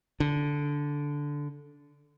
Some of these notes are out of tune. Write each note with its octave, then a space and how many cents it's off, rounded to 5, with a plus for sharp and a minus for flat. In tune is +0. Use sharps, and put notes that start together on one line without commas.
D3 -10